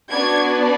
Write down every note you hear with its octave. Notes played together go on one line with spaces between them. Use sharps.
B3 D4 F#4 G#6